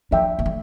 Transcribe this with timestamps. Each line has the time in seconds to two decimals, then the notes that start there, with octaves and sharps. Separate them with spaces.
0.11 F3 D4 A4 E5 G5
0.39 A#3
0.46 A3